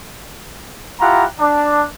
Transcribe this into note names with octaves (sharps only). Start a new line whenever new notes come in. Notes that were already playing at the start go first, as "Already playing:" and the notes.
E4 F4 G4 F#5 A#5
D4